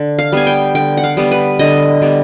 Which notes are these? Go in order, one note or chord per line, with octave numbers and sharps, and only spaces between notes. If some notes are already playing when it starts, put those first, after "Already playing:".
Already playing: D3
F5
G3 B3 G#5
G5
D3 G5
F#5
F5
G3 B3
B4
D3 D#5
G3 B3